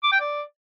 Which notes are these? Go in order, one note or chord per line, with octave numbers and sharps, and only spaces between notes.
D6
G5
D5